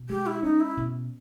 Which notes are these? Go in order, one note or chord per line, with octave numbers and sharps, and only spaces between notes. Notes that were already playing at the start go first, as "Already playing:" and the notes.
Already playing: B2
G#3 G4
E4
C#4 D#4
E4
B2